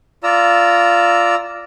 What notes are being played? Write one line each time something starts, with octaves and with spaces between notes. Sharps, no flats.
F4 D5 A#5 E6